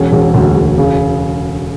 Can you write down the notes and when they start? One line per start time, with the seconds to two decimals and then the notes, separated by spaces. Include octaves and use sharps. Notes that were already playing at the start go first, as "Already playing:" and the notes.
Already playing: E1 C#4
0.13 E1
0.34 D2
0.56 E1
0.78 C#3